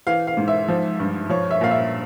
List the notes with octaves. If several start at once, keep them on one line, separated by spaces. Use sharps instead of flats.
E3 F5
F5
G#2
E5
F3
G2
F3 C#5
E5
A#2 F5
E5